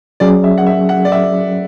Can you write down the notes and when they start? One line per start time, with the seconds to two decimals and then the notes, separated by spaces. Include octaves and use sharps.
0.20 F#3 C#4 G#4 D5
0.44 E5
0.58 F#5
0.66 E5
0.89 F#5
1.05 D5
1.12 E5